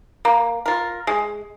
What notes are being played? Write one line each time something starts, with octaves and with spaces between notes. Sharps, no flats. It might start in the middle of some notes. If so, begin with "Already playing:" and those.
A#3
F4 A#4
G#3